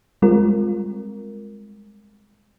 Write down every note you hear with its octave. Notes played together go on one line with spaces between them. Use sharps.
G3 G#3 C4 F4 A#4